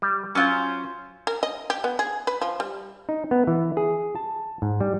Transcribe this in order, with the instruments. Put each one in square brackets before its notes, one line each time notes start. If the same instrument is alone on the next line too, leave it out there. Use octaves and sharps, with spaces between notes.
[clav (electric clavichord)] G3
[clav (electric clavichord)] F#3 [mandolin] C#4 F4 C5
[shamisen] A#4
D#5
G4
B3
G#4
B4
F3
G3
[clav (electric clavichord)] D#4
B3
E3
G#4
A5
G#2
G3